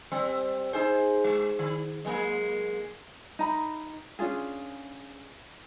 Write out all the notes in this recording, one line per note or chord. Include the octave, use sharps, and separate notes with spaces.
G3 C4
D#4 G#4 C5
G#3
D#3
F#3 G#3 A#3
D#4 A#5 B5
C#4 D4 F4 G#4